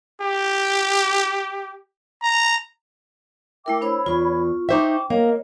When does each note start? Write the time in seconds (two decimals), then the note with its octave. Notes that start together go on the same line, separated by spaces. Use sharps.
0.21 G4
2.23 A#5
3.66 A3 E4 A#4 E5 G5 D6
3.81 D4 C5 C#5 B5 E6
4.06 E2 F4 C#6
4.69 D#4 C5 E5 G5 C#6 D6
5.10 A#3 A#4 C#5 D#5